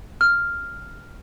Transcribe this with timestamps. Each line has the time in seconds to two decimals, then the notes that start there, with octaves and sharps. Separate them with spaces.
0.21 F6